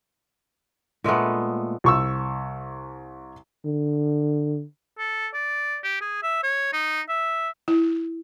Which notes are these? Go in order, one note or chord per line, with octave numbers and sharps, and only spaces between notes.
A#2 G#3 A3 B3
C2 C#6 E6
D3
A4
D5
G4
G#4
E5
C#5
D#4
E5
E4